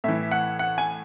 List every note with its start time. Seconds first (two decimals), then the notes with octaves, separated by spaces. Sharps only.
0.04 A2 E3 E5
0.31 F#5
0.59 F#5
0.78 G#5